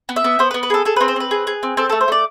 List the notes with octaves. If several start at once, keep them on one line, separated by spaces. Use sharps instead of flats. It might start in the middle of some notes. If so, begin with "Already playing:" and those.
B3
E5
B3
B3 C5
B4
B3
B4
G#4 A4
G#4 A4
C4 B4
C5
C4 B4
G#4
G#4
C4
C4 A4
A3 A4
C5
A3 D5